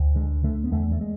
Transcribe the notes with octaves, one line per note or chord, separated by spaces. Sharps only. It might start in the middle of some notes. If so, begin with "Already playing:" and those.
Already playing: D2
D3 G#3
D3 A3
B3
E2 A3
A3
G#3